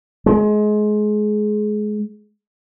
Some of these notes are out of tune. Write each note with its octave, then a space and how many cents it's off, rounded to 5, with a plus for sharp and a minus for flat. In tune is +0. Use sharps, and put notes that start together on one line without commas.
G#3 +25